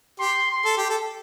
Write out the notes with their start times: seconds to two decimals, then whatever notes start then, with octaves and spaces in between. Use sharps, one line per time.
0.19 G4 C6
0.51 C6
0.65 A4
0.78 G4
0.90 A4